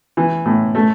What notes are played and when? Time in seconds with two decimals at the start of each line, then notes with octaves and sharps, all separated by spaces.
0.17 E3
0.45 A2
0.75 A3